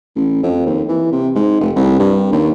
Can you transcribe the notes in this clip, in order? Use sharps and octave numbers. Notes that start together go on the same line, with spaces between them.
A1
F2
D#2
E3
C3
G#2
F1
C2
G2
D#2